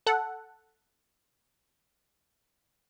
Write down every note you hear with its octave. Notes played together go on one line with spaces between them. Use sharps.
A4 F#5